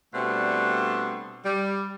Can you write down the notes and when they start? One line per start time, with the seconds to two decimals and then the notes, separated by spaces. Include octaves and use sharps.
0.14 B2 G3 A3 C4 D4
1.45 G3